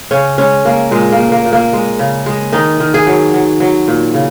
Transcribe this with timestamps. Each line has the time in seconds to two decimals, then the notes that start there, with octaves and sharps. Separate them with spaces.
0.11 C#3 C#4
0.38 G#3 C#4
0.65 G#3 A#3
0.91 A#2 G#3
1.12 A#3
1.19 A#2
1.32 A#3
1.45 A#2
1.53 A#3
1.73 G#3
1.99 C#3
2.26 G#3
2.52 D#3 D#4
2.80 D#3
2.94 G#4
3.07 F#3
3.34 F#3
3.60 F#3
3.88 A#2
4.14 C#3